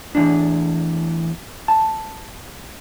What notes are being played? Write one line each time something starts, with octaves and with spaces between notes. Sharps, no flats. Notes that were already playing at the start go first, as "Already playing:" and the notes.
E2 A2 D4
A5